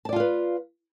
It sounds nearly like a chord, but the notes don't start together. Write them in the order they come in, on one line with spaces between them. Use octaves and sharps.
A5 D5 F4 F5 B4